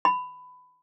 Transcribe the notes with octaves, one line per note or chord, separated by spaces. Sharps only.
B5